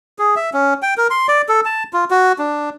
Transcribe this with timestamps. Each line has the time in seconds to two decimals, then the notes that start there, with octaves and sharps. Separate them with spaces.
0.19 G#4
0.36 E5
0.54 C#4
0.82 G5
0.98 A#4
1.10 C6
1.28 D5
1.49 A4
1.65 A5
1.93 F4
2.11 F#4
2.39 D4